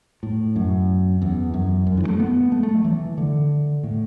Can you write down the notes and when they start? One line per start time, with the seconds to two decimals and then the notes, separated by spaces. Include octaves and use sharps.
0.23 A2
0.56 F#2
1.22 E2
1.54 F#2
1.87 F#2
1.97 E3
2.04 F#3
2.08 A3
2.20 B3
2.52 A3
2.63 A3
2.74 F#3
2.84 E3
3.18 D3
3.84 A2